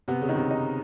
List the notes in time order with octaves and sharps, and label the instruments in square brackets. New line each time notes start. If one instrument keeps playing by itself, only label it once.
[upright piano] C3 [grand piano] B3
[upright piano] C#3
[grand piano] D#3
[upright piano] C3
[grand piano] D#4